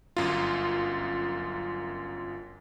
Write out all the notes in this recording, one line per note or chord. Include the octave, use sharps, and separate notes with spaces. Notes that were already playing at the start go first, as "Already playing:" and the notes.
G1 F#2 F4